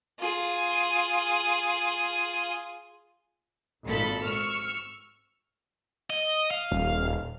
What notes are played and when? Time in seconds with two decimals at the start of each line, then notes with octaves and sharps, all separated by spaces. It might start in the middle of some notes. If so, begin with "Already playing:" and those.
0.20 F4 G#4
3.84 G#1 A#2 A4 B5
4.22 C#6 E6 F6
6.10 D#5
6.51 F5
6.71 D#1